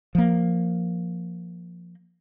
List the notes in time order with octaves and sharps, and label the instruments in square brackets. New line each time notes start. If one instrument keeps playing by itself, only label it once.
[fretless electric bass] F3 A#3